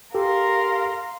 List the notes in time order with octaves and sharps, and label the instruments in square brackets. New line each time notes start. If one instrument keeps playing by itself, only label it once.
[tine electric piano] G4 A4 [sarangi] A#4 [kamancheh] F5 C6